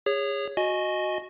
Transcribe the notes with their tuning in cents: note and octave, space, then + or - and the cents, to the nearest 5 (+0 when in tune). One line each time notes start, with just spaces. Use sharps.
G#4 -30 C#5 +0
F#4 -15 D#5 -5 G#5 +15